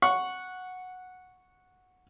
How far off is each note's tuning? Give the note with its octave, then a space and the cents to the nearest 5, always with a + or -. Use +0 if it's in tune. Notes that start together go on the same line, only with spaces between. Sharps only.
F#5 -10 C#6 +0